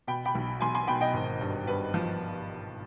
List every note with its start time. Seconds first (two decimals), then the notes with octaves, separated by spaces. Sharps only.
0.07 B2 G5 B5
0.25 G5 B5
0.35 B1
0.61 B1 G#5 C6
0.75 G#5 C6
0.87 B2 G5 B5
1.01 D#5 G5
1.14 G#1
1.41 G2
1.67 G2 B4
1.94 F3